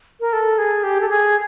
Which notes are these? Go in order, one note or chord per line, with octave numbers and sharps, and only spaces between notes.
A#4
A4
G#4
G4
A4
G#4